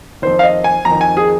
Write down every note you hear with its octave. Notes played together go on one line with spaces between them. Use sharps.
F2 D#3 C5
F5
D#5
G#5
F2 D#3 A#5
G#5
G#4